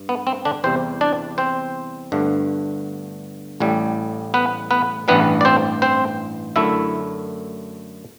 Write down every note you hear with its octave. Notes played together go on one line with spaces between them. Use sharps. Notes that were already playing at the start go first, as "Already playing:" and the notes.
Already playing: G2
B3
C4
D3 D4
E2 C3 G3 C4 C5
D4 D5
C4 C5
G1 G2 D3 A3
A1 A2 G3
B3 B4
B3 B4
A1 G2 E3 G3 B3 B4
D5
C4 C5
C4 C5
F#2 D3 A3 E4 E5